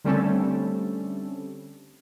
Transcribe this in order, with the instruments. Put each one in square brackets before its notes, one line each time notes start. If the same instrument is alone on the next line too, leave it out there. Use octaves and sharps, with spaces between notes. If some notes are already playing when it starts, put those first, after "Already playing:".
[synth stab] D3 G3 A3 C4 C#4 A4